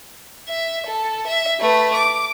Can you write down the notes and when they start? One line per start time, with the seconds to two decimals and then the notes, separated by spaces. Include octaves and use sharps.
0.48 E5
0.87 A4
1.27 E5
1.60 A3 B4
1.95 D6